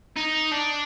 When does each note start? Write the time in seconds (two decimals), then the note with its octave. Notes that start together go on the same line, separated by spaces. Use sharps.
0.17 D#4
0.52 D4